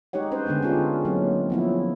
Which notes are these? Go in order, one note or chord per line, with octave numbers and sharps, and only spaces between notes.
G#3 D#4 G4 C#5 F#5
C#4 B4 C5
D3 G#3 B3 C#4 D4
C#4 D#4 F4 G4 G#4
F#3 A#3 C4 E4
F3 B3 E4